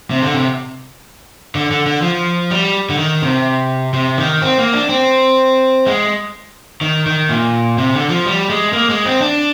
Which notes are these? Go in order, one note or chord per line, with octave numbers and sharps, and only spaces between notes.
C3
D3
C3
D3
D3
D3
F3
G3
D3
D#3
C3
C3
D#3
C4
A#3
D4
C4
G#3
D#3
D#3
A#2
C3
D3
F3
G3
G#3
A#3
G#3
C4
D4